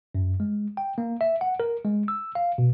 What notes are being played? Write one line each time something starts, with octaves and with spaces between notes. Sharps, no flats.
F#2
G#3
G5
A#3
E5
F#5
A#4
G#3
E6
F5
B2